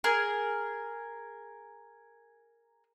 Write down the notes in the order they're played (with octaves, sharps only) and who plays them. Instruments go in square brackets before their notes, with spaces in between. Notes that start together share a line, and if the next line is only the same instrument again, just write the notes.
[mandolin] G#4 A#4